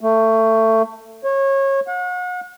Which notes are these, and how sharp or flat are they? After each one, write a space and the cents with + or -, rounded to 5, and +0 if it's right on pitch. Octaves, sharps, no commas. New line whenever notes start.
A3 +25
C#5 -25
F#5 -40